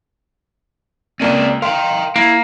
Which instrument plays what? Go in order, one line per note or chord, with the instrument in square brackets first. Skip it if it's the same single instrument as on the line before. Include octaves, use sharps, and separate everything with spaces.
[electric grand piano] C#2 A#3 D#7 [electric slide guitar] C4 D5 A5
[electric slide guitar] A#4 G5 A#5 [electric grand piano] F5 C6
[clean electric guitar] A#3 [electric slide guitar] E4